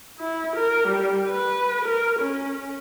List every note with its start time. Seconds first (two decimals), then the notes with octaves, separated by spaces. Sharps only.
0.19 E4
0.56 A#4
0.88 G3
1.29 B4
1.84 A#4
2.19 C#4